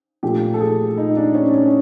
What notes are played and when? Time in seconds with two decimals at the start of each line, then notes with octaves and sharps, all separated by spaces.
0.23 A#2 F3 A3 G4
0.54 A4
0.60 G#4
0.98 D#4
1.17 D4
1.35 C#4
1.54 C#4